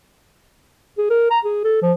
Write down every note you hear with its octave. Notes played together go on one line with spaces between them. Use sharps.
G#4
A#4
A#5
G#4
A4
F3